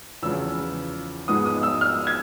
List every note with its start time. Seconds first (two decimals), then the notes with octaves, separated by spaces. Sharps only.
0.22 E2 C#3 F3 E6
1.28 G#2 F3 G#3 B3 D#4 D#6
1.46 D#6
1.63 E6
1.81 F6
2.07 G#6